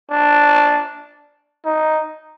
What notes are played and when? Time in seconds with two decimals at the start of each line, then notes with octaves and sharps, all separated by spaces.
0.10 D4
1.65 D#4